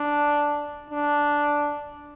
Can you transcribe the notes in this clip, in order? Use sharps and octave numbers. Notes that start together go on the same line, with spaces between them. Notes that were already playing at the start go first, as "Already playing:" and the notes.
Already playing: D4
D4